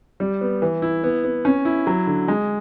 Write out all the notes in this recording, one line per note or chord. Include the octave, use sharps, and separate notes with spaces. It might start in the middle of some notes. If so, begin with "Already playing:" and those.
G3
B3
E3
E4
B3
B3
C#4
E4
F#3
D3
G#3